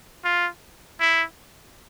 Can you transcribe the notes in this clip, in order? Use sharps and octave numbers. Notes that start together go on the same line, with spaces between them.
F4
E4